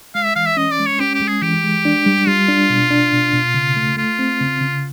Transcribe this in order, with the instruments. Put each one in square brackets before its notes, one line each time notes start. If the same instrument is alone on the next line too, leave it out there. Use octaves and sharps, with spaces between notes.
[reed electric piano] G#3 [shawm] F5
[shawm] E5
[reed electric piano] E3 [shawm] F5
[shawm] E5
[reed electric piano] C#4 [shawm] D#5
[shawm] D5
[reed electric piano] G#3
[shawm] C#5
[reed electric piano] C#4 [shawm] G4
[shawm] G4
[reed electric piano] G#3
[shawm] G#4
[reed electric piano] E3 [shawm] G4
[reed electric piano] G#3
D4
G3
[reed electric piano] G3 [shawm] F4
[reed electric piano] D4
B2
D4
B2
B2
C#3
A3
[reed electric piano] A3 [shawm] F4
[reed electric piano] C4
C#3
C#3